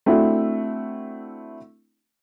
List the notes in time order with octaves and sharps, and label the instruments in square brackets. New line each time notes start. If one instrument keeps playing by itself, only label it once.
[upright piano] A3 C4 D4 E4 F#4